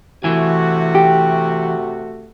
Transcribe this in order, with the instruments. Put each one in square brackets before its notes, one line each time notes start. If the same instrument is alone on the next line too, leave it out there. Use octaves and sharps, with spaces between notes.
[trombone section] C3 A3 F#4 [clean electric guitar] E3 E4 G#5
[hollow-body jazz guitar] G4